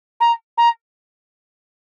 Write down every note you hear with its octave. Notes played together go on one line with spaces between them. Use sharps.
A#5
A#5